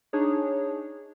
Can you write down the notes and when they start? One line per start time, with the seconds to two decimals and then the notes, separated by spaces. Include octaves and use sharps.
0.13 D4 D#4 G#4 C#5